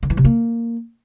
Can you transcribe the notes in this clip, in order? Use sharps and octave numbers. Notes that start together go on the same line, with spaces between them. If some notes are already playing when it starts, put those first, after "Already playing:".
D3
E3
C3
A#3